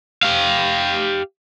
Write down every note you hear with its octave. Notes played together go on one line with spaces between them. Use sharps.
G4 F5